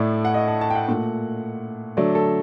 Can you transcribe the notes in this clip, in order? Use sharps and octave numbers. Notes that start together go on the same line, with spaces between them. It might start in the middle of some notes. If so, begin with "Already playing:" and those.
Already playing: A2 A3 D5
F#5
D#5
A5
A5
G5
F#5
A#2 A3
D3 F#3 A3 D5
A4